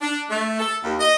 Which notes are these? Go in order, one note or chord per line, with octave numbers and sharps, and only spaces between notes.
D4
A3
A4
D#2
D#5